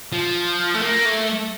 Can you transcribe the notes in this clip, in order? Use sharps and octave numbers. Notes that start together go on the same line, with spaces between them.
F3
A3
A#3
A3